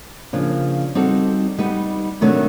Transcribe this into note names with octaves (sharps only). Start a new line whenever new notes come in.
C#3 F3 A#3 D4
G3 C4 D#4 F#4 A4
G3 B3 D#4 G4
C3 D#3 F#3 A3 D4